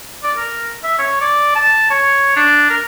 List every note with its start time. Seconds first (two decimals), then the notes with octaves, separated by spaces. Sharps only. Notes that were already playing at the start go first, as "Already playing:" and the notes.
0.24 D5
0.37 A#4
0.84 E5
0.99 C#5
1.21 D5
1.56 A5
1.90 C#5
2.36 D4
2.70 A#4